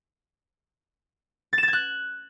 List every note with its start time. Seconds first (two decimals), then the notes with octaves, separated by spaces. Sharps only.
1.53 A6
1.58 E7
1.63 A6
1.68 G#6
1.73 F#6